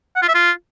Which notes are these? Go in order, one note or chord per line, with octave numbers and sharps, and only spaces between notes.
F#5
F4
E5
F4